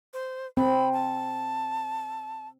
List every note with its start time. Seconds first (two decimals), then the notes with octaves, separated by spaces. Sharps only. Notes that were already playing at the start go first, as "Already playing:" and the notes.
0.13 C5
0.57 C4 B5
0.93 A5